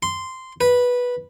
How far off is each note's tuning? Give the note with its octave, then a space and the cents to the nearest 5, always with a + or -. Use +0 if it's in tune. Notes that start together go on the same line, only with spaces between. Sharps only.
C6 -10
B4 -10